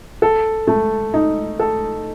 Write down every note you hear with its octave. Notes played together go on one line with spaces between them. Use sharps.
A4
A3
D#4
A4